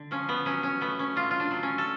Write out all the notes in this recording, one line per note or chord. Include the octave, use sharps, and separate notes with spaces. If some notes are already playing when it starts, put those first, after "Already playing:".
Already playing: D3
F3 C#4
B3
F#3 C#4
C#4
A3 B3
C#4
A2 F4
F4
D4
F#3
C#4
A4